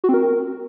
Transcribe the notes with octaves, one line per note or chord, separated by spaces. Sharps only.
F#4
C4
A#4